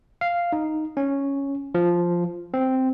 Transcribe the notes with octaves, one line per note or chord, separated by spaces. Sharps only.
F5
D#4
C#4
F3
C4